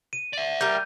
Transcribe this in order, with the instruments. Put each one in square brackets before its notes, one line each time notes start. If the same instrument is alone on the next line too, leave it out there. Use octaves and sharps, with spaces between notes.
[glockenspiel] D#7
[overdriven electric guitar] D5 E5
[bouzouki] G3 A#4 [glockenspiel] G6